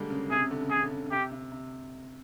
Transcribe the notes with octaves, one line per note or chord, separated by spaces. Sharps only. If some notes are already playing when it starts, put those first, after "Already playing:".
Already playing: D3 G3 G#3 A#3
C#3
C3 G#4
C#3
D3
C#3
D3 G#4
C#3
D3
C#3
C#3
C3 G4
C3
C3